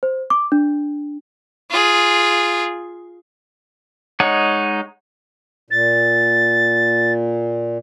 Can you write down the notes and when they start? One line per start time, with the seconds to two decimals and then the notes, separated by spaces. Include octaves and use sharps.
0.03 C5
0.30 D6
0.52 D4
1.70 F4 G#4
4.20 G#3 D#4 C#5 F#5
5.71 A#2 A6